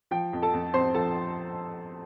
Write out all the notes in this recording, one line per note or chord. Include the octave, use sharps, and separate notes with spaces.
F3 G5
F2
A4 A5
F2
C4 C5 C6
F3 A4 A5